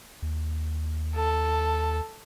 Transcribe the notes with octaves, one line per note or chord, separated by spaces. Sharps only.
D#2
A4